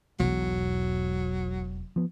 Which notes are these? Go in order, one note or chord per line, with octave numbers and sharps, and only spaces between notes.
E1 B1 E2 F#3
F3 B3